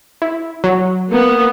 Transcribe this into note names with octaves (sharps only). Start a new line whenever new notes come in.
E4
F#3
A#3 B3